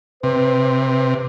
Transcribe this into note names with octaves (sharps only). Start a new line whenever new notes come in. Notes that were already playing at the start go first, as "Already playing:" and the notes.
C3 B4